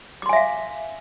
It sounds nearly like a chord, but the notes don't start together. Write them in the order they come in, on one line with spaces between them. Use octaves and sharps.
D6 C6 G#5 E5 F5